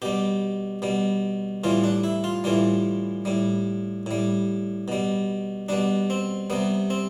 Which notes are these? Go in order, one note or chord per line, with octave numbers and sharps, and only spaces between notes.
B2 G3 G4
B2 G3
A2 E3 G3 F4
D4
E4
F4
A2 E3 G3 F4
A2 G3
A2 G3
B2 G3
B2 G3 D4
C4
C3 G3 B3
C4